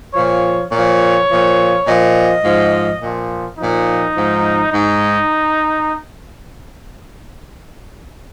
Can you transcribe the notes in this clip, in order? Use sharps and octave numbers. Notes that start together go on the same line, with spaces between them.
A#2 F3 C#5
A#2 F3 C#5
A#2 F3
A#2 F3 D#5
G#2 F3
A#2 F3
A#2 F3 D#4
G#2 F3
G#2 D#4